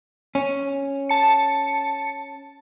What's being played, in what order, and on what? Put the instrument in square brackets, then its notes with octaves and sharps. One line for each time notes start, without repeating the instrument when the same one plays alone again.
[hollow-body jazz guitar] C#4
[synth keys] A5 C#7